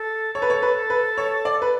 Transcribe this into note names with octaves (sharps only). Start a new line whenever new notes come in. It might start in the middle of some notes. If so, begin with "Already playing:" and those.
Already playing: A4
A4 C#5
B4
C#5
B4
B4
C#5
D5
B4